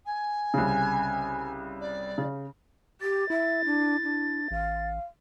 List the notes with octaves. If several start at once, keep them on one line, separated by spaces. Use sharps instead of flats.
G#5
C2 C#3
D5
C#3
G4 A6
E4 E5
D4
D4
A1 F5